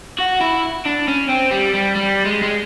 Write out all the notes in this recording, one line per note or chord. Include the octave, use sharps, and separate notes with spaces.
F#4
E4
D4
C#4
C4
G3
G3
G3
G#3
G#3